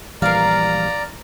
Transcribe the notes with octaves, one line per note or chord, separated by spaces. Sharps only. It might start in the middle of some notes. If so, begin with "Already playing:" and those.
A#1 E3 G3 A#4 D5 F5 A#5